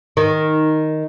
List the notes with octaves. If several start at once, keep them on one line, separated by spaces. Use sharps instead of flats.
D#3